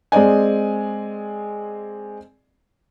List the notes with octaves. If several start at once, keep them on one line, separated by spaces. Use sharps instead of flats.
G#3 C4 D5 D#5 G#5